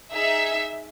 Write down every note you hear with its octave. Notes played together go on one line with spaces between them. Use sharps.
D#4 G#4 E5